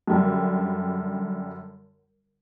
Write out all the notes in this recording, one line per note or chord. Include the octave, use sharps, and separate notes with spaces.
F#2 D3 G3